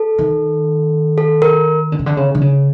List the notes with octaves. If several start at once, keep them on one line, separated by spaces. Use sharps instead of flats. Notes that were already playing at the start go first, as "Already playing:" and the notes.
Already playing: A4
D#3
A4
A#4
D3
C#3
D3
C#3
D3
C#3